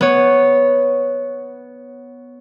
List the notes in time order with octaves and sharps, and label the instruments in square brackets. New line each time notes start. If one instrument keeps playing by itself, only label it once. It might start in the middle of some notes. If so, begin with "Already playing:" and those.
[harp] B3 C#5